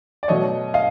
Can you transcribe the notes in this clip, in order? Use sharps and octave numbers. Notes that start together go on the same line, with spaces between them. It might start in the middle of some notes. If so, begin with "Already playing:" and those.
D5
B2 F#3 A3 C#5 D#5
D#5 F5